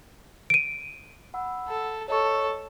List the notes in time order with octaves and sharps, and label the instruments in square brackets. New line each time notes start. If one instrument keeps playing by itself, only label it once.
[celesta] D7 D#7
[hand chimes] F#5 B5 E6
[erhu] A4
[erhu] A4 [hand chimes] C#5 D#5 C#6